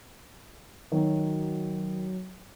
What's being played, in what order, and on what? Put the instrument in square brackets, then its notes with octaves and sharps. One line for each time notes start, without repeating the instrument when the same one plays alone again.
[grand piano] D#3 [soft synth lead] F#3